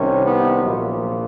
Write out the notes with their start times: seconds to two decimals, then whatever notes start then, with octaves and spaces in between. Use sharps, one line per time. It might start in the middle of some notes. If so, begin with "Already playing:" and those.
Already playing: C2 C3 D#3 C#4
0.23 B3
0.62 A#1 A#2 F#3